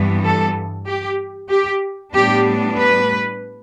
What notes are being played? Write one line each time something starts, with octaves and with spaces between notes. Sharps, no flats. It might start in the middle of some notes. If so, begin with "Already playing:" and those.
Already playing: G2 E3 G3 B3
A4
G4
G4
A2 G3 B3 D4 G4
B4